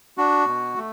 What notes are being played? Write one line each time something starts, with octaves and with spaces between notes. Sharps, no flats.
D4 F#4
B2
A3